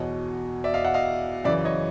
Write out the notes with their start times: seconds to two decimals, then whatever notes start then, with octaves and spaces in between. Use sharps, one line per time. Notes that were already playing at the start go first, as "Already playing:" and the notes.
Already playing: E2 B2 C#5 D#5
0.64 D5 E5
0.74 D#5 F5
0.84 E5 F#5
0.94 D#5 F5
1.44 F#2 C#3 E3 D5 E5
1.65 C#5 D#5